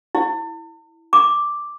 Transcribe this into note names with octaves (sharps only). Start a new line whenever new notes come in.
E4
D6